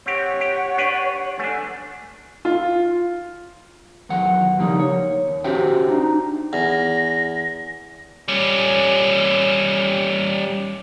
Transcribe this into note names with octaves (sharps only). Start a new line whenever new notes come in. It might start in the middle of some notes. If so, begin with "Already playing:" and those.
C4 G4 C#5 F#5 C#6
G4
D4 G4 B4
A3 D4 G#5
F4
E2 D#3 F#3 F#5
C#3 F3 G3 A#3 D#4
C#5
D#2
C#4 F#4 G4 C5 E5 G5
D4 D#4
E2 A#6
G3 C#4